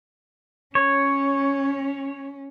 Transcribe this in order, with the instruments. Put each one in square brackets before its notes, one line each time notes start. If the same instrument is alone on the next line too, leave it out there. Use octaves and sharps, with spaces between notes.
[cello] C#4 [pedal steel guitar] C#5